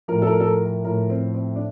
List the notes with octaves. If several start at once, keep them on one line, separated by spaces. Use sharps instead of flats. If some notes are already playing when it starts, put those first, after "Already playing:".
A2 F3 A#4
A4
A#4
A4
A#4
A#4
A2 F3 A#4
C4
C4
D4